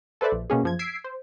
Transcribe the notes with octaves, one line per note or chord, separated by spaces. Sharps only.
A4 B4 C5 D5 E5
A#1
B2 A#3 C#4 G#4
F#2 F3 G#6
E6 G#6 B6 C7 D7
C5